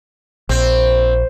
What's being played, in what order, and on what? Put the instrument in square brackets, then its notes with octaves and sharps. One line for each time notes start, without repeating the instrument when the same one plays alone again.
[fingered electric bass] A#1 [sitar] C4